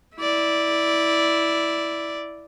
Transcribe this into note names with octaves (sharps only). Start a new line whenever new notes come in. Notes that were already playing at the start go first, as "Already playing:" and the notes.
E4 D5